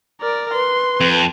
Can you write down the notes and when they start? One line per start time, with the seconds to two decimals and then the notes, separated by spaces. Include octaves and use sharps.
0.21 A#4 D5
0.54 B4 C6
1.01 F2